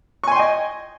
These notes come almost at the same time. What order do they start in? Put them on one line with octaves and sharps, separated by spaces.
C#6 G#5 C6 G5 D#5